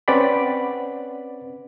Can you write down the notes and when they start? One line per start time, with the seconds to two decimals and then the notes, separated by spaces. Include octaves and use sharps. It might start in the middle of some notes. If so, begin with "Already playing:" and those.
0.08 C4 C#4 B4 D5 F#5 B5